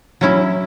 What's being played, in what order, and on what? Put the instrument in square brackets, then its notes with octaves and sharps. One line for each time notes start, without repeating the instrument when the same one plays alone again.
[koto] F#3 C#4 E4